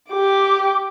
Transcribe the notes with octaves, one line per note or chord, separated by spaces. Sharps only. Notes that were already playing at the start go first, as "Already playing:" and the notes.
G4 D6